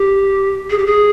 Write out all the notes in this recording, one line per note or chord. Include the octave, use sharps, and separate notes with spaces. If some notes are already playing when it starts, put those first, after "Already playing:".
Already playing: G4
G#4
G4
G#4